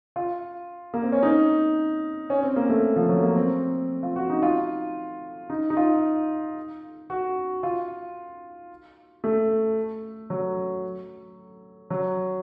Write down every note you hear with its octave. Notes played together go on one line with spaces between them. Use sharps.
F4
A#3
C4
C#4
D#4
C#4
C4
A#3
A3
F3
F#3
A#3
C4
F4
F#4
D#4
F4
D#4
D#4
F4
F#4
F4
A3
F#3
F#3